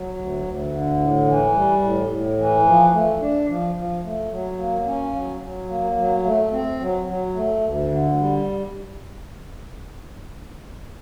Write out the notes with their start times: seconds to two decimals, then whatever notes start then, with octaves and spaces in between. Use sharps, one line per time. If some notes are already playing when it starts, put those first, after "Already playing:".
Already playing: F#3
0.17 D2
0.44 D2
0.72 D3
0.99 A2
1.27 E3
1.54 G3
1.82 A2
2.10 A2
2.38 E3
2.65 F3
2.93 A3
3.20 D4
3.48 F3
3.75 F3
4.03 A3
4.31 F#3
4.58 A#3
4.86 C#4
5.14 F#3
5.41 F#3
5.69 A#3
5.96 F#3
6.24 A3
6.52 C4
6.80 F#3
7.07 F#3
7.34 A3
7.62 D2
7.90 D3
8.18 G3